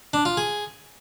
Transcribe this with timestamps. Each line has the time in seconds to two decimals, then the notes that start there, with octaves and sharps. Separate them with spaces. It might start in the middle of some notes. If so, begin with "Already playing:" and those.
0.13 D4
0.25 F4
0.37 G#4